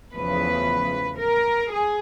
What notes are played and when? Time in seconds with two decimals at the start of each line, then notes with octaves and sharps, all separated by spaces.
0.14 E2 C#3 F3 A3 B4
1.19 A#4
1.71 G#4